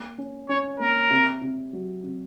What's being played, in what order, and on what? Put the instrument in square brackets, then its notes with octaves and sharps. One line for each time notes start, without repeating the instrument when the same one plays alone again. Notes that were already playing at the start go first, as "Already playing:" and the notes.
Already playing: [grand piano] A#3
C#4
[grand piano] C#4 [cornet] C#5
[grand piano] A#3 [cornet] A#4
[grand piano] C3
C3
F#3
C3